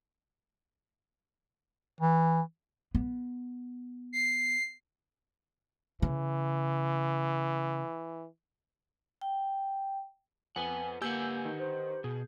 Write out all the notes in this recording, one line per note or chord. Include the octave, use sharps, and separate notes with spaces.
E3
B3
C7
C#3 E3
G5
F2 B4 F#5 G#5
A#3 G4 B4 F#5 G#5 E6 G6
D#3
C5
B2 G#4